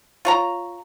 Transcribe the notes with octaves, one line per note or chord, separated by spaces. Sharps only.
F4 C#5 A#5